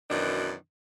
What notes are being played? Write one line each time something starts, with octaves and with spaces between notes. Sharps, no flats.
F#2 B2 D#3 E3 D4